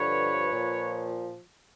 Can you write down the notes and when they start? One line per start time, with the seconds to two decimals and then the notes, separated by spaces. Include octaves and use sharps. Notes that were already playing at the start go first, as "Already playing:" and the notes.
Already playing: G2 D3 F3 B4 C#5
0.50 A#2 F3